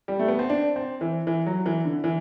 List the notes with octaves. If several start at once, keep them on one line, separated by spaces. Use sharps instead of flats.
G3
A3
B3
C4
D4
C4
E3
E3
F#3
E3
D3
E3